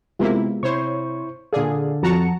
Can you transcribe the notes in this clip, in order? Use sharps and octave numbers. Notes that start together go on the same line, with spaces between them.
C3 G#3 A#3 B3 E4 F4
C3 E4 C5 C#5 C#6
A#2 D3 G#4 A4 D5 F5
F2 F3 F#4 A5 A#5 C#7